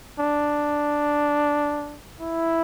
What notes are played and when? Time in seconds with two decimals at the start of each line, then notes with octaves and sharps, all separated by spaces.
0.19 D4
2.20 E4